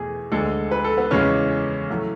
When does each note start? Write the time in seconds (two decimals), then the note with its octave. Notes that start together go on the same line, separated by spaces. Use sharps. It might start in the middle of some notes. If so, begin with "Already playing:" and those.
Already playing: E2 B2 A3 G#4
0.32 D2 D3 G#3 A4
0.71 B4
0.84 A4
0.98 B3
1.11 E2 C#3 E3 G#3 C#4
1.90 A2 F#3 A3